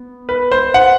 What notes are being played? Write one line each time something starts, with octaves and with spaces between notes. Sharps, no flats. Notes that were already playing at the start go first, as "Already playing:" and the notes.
Already playing: B3
B4
C5
F#5